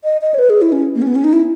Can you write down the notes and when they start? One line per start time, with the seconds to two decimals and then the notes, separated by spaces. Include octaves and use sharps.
0.04 D#5
0.21 D#5
0.34 C#5
0.39 B4
0.50 G#4
0.62 E4
0.72 C#4
0.95 A#3
1.02 C#4
1.07 B3
1.15 C#4
1.24 D#4
1.33 E4